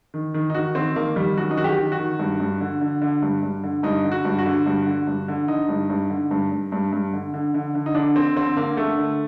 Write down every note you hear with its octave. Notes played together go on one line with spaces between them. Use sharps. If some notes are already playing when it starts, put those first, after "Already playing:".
D#3
D#3
D#4
D#3 F#4
D#3 C4
D#3 A#3
D#3 G3
F#2 F#4
D#4
D#3 F#4
G4
D#3
F#4
D#3
G2
G2
D3
D3
D3
G2
G2
D3
G2 D#4
D3
F#4
G2
F#4
D3
G2
D3
G2
D3
D3 D#4
G2
G2
D3
G2
G2
G2
G2
D3
D3
D3
D3
D#4
D3 D4
D3 C4
D3 C4
D3 A#3
D3 A3
D3